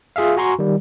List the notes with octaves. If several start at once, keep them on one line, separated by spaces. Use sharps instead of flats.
F4 G#4 E5 F5
F#4 G#5 A#5 C6 C#6
D#3 G3